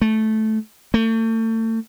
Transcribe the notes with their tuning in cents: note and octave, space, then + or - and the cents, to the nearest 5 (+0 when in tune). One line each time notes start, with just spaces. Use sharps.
A3 -10
A3 +35